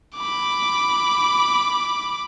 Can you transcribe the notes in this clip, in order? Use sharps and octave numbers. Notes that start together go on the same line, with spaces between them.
B5 D6